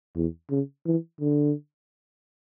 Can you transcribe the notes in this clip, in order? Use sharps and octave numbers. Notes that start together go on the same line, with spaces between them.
E2
C#3
E3
D3